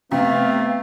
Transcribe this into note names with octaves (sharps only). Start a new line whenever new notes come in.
C3 A3 B3 F5